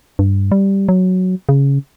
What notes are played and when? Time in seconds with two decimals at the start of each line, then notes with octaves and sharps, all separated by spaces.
0.19 G2
0.52 G3
0.89 F#3
1.49 C#3